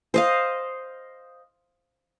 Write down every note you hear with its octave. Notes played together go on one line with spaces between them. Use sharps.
C5 D#5 F5